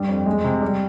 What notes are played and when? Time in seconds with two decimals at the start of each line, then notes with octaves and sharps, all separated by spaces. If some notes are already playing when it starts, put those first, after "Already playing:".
Already playing: G2 G3
0.08 F2
0.26 G#3
0.44 C3
0.62 G3